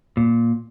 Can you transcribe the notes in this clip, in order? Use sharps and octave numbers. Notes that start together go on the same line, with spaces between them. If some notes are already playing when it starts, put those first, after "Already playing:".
A#2